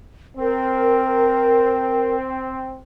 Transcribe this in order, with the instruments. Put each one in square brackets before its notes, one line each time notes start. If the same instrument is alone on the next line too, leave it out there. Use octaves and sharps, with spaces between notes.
[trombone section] C4 [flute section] A#4